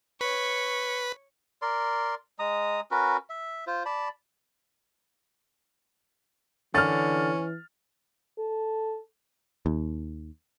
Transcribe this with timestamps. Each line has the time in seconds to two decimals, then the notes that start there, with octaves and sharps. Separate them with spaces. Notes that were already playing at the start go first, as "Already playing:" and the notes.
0.21 B4 C#5 C#6 B6
1.62 A#4 D5 C6
2.39 G#3 A#5 D#6
2.91 C#4 F#4 A#4 B4
3.30 E5
3.67 F4 C5
3.86 D5 A5 B5
6.75 D3 E3 C#4 F6 A6
8.39 A4
9.66 D#2